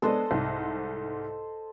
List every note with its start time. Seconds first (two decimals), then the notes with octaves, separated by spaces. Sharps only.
0.02 G#3 B3 D4 A4 C5 D#5
0.31 C2 G#2